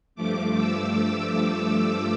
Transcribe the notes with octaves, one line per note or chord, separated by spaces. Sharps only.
G2 F3 A3 D6
E6